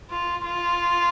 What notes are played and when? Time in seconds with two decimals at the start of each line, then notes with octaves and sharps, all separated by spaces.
0.10 F4
0.45 F4